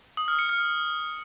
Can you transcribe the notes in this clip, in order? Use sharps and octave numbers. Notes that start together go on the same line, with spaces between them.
D#6
F6
C#7
F6